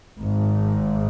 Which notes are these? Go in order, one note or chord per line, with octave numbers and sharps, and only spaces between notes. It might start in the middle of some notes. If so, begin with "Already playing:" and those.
G#1 G#2